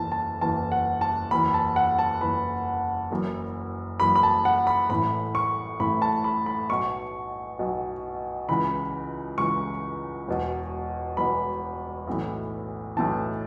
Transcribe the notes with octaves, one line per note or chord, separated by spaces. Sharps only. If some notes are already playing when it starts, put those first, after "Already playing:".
Already playing: F#1 E2 E3 A5
A5
F#1 E2 E3 A5
F#5
A5
F#1 E2 E3 B5
A5
F#5
A5
F#1 E2 E3 B5
F#1 F#2 E3
F#1 F#2 E3 B5
B5
A5
F#5
B5
A1 A2 E3 B5
C#6
A1 A2 E3 B5
A5
B5
B5
B1 B2 C#6
B1 B2
C#2 C#3 E3 B5
C#2 C#3 E3 C#6
E1 E2 B2
E1 E2 B2 B5
B1 A2 E3
B1 A2 E3 A5